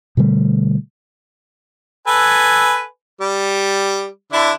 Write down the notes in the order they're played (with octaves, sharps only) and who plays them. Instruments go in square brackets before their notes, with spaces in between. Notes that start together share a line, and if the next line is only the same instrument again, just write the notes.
[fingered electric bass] B2 D3 G3 A3
[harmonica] A4 B4 G#5
G3
D3 D4 E4